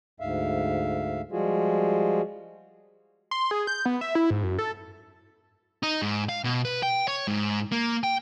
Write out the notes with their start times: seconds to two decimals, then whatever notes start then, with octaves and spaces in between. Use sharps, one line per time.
0.20 D2 G#2 E5 F5
1.32 F3 G3 G#3 F4 F#4 G#4
3.31 C6
3.51 G#4
3.67 G6
3.86 B3
4.01 E5
4.15 E4
4.30 G#2
4.43 F#2
4.59 A4
5.83 D#4
6.02 G#2
6.29 F5
6.44 B2
6.65 B4
6.83 G5
7.08 C#5
7.28 G#2
7.72 A#3
8.04 G5